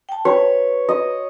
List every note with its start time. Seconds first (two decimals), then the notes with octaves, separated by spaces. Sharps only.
0.09 G5 A5
0.25 B4 C#5
0.89 D#5